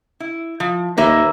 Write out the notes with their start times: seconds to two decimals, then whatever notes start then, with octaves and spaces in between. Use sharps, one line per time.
0.20 E4
0.60 F3
0.97 D#2 A#3 B4 E5